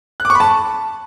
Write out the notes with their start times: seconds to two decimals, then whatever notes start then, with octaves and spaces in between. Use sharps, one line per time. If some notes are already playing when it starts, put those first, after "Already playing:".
0.20 F#6
0.25 D6
0.30 C#6
0.35 B5
0.40 A5